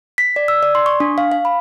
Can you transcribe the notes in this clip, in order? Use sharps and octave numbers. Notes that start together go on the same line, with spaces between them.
B6
D5
E6
D5
C6
C#6
D4
F5
F5
B5